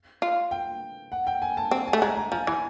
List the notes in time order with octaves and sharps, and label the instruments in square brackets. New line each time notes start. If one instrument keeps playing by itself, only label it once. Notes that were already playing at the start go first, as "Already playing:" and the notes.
[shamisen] F4
[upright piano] G5
F#5
G5
G#5
A5
[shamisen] C4
[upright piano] G#5
[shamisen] A3
[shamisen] G#3 [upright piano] A#5
[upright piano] A#5
[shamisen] F3 [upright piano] G#5
[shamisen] E3 [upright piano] G#5